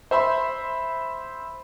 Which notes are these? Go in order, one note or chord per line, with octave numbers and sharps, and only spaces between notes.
C5 E5 B5 C6